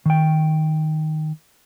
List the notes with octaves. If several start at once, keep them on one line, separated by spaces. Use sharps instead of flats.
D#3 G5